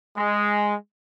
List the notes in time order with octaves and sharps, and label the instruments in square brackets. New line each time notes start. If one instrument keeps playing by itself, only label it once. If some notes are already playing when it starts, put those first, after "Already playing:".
[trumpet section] G#3